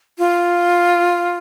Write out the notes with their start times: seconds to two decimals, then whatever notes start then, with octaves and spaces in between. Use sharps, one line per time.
0.18 F4